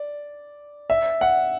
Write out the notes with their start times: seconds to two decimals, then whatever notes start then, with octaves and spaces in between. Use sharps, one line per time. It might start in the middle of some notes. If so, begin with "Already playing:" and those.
Already playing: D5
0.90 E5
1.21 F#5